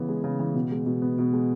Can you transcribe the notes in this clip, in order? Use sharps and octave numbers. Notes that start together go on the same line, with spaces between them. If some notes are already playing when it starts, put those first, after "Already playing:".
Already playing: C#3 E3 B3
G#3
C#3
E3
B2
G#3
B2
B3
B2
G#3